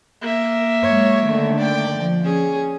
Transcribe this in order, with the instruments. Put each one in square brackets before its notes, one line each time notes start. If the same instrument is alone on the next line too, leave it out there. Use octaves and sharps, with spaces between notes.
[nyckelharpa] A#3 E5
[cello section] F#3 G#3 C#5
D3 D#3 A3
[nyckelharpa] D5 G5
[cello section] F3
[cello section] C#4 [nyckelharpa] G#4